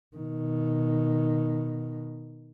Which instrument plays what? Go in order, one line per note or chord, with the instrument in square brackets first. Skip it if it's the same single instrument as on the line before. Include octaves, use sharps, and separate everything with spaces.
[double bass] B2 D#3